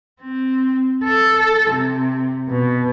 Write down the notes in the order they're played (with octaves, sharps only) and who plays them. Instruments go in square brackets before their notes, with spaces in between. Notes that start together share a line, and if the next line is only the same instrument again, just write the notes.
[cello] C4
A4
C3
B2